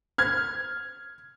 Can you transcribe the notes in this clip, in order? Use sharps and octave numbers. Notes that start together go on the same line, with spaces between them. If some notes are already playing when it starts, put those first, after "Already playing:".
F6 G#6